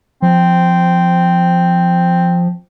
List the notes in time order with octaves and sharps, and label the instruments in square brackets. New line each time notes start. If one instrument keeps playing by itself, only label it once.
[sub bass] F3 [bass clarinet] C4